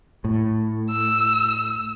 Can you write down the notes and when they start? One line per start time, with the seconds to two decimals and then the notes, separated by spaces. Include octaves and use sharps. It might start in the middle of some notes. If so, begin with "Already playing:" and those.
0.24 A2
0.90 E6